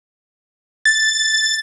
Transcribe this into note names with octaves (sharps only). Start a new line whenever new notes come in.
A6